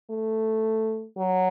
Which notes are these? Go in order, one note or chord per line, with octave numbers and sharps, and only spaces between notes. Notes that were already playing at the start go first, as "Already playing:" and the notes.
A3
F#3